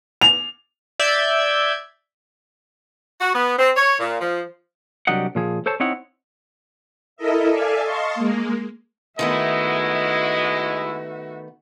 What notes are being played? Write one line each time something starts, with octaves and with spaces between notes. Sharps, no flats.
F7
D5 E5 G6 G#6
F#4
B3
C4
C#5
A#2
F3
C2 F#3 D4 G4 D#5 F#5
A#2 F3 G#4
A4 C5 C#5 A5
C4 D#4 E4 C#5 D#5 F#5
E4 A4 A#4 D#5 E5
A4 D5 E5 F5 G#5
D#5 F5 A5 C6 C#6
G#3 A#3
D#3 G#3 A3 B3 E4 F#4 D#5 E5